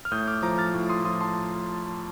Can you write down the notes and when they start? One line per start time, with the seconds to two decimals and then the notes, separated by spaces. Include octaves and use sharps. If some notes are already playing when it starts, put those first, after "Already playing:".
0.05 F6
0.12 A2 D#6 G6
0.27 D6 F6
0.42 F3 A#5 D6
0.58 F6 A6
0.74 A2
0.89 C6 D#6
1.05 F3 C6 D#6
1.21 A5 C6